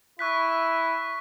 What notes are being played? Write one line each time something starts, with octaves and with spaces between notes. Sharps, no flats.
E4 C#6 F#6 B6